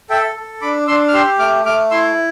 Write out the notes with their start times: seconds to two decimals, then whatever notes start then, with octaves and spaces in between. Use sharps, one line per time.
0.10 A4 E5 G5
0.36 A4
0.62 D4 B5 D6
0.87 D4 C6 E6
1.08 F6
1.14 G4 C6 E6
1.39 A3 D6 F6
1.65 A3 D6 F6
1.91 E4 C6 E6